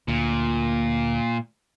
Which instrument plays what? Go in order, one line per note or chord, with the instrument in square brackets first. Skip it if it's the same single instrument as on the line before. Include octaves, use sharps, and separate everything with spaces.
[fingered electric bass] D2 [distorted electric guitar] A#2